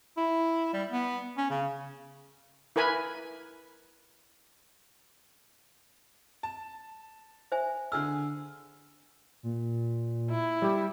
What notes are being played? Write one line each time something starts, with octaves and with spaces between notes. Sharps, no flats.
E4
G3
B3
C#4
C#3
E4 A#4 B4 G#5 B5
A5
C5 E5 G#5
D3 G#4 E6 F6
A#2
E4
G3 G4